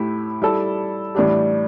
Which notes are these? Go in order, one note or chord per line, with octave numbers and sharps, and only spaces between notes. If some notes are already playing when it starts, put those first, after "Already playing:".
Already playing: A2 A3 E4 G4
G3 E4 A4
A2 E3 G3 D4 G4